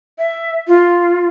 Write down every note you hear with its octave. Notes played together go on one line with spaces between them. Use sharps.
E5
F4